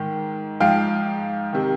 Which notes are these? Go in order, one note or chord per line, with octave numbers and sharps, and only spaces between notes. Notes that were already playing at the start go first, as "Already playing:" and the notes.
Already playing: G#2 D#3
G#2 F3 F5 G5
C3 D#3